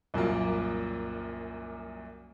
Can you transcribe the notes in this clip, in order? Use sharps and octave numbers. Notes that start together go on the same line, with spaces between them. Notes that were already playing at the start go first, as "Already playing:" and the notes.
C2 F#2 A#2 A#3